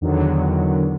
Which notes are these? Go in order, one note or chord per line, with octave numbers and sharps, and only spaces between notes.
E2 D3 D#3 F#3